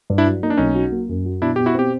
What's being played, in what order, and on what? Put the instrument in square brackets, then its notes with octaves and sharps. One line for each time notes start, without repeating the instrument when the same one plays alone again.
[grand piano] G2
[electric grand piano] D4 E4
[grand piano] F#3
[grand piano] A#3 [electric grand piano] D#4
[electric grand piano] D4
[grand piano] B1 [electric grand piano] C#4 D#4
[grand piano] F#3
A#3
F#2
F#3
[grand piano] B2 [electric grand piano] D4 E4
[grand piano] B2 [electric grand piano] G4
[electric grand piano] E4 F#4
[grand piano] C4 [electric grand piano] G4